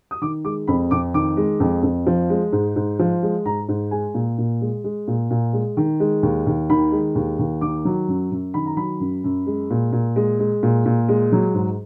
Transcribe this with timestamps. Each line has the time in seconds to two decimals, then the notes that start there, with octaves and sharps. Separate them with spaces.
0.11 D#6
0.22 D#3 D6
0.45 G#3 D6
0.68 F2 B5
0.91 F2 D6
1.14 D#3 D6
1.37 G#3
1.60 F2
1.83 F2
2.07 F3
2.30 G#3
2.52 G#2
2.76 G#2
2.99 F3
3.23 G#3
3.45 G#2 A#5
3.69 G#2
3.91 G#3 G#5
4.14 A#2
4.38 A#2
4.61 G#3
4.84 G#3
5.08 A#2
5.31 A#2
5.53 G#3
5.77 D#3
6.00 G#3
6.23 D#2
6.47 D#2
6.70 D#3 B5
6.92 G#3
7.15 D#2
7.39 D#2
7.61 D#3 D6
7.85 F#3
8.08 F#2
8.32 F#2
8.54 D#3 B5
8.66 A#5
8.77 F#3 B5
9.00 F#2
9.24 F#2
9.46 G#3
9.70 A#2
9.93 A#2
10.16 G#3
10.40 G#3
10.63 A#2
10.86 A#2
11.09 G#3
11.32 F#3
11.54 G#2